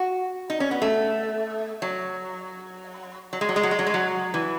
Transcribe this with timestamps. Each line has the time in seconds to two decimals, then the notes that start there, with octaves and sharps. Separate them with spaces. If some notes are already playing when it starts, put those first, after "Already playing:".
Already playing: F#4
0.50 D#4
0.60 C#4
0.71 B3
0.82 A3
1.82 F#3
3.33 F#3
3.41 G#3
3.49 F#3
3.56 G#3
3.63 F#3
3.71 G#3
3.79 F#3
3.87 G#3
3.94 F#3
4.34 E3